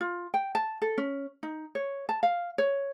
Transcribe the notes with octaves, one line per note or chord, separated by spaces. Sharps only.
F4
G5
A5
A4
C#4
D#4
C#5
A5
F5
C#5